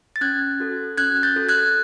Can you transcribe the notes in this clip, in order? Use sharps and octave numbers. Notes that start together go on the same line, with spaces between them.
A6
C#4 F#6 G#6
F#4 A4
C#4 F#6 G#6
G6 A6
F#4 A4
F#6 G#6